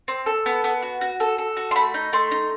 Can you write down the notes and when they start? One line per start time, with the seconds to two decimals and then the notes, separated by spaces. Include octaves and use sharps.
0.08 C4
0.26 A4
0.46 B3
0.64 B3
0.83 F#4
1.01 F#4
1.20 A4
1.38 A4
1.57 F#4
1.71 C6
1.76 A3 B5
1.94 D#4
2.13 A3 C6
2.31 D#4